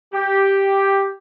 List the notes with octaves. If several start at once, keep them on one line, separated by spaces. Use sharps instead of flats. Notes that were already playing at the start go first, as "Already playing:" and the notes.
G4